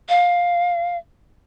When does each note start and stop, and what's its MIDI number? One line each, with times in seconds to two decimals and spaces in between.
0.09 0.97 77